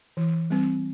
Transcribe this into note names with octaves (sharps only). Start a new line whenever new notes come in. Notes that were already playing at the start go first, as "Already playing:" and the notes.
E3
G3 C4